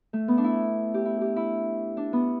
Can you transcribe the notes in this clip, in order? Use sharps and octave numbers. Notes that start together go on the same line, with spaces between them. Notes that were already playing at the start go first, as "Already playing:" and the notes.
A3
B3
D4
E4
G4
E4
G4
E4
D4
B3